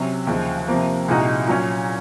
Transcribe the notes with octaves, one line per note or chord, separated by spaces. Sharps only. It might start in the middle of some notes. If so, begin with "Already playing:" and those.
Already playing: C3 F#3 C#4
D#2 C#3 F3 G#3
C3 F3 A#3
C2 A#2 G#3 D#4 F#4
A#2 F#3 C#4